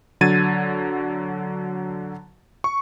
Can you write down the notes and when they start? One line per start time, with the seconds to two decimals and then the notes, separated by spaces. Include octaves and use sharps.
0.21 D3 F#3 G#6 A6 D#7
2.64 C#6